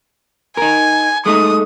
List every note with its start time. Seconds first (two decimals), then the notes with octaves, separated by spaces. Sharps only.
0.57 D#4 A#4 G#5
1.26 G#3 A3 D#4 D#6